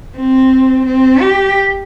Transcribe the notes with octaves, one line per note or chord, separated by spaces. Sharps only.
C4
C4
G4